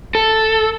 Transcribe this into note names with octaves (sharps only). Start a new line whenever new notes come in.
A4